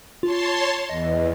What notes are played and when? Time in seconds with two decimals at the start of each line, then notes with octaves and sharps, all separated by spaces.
0.23 F4 C#5 A5 C6
0.89 E2 D#5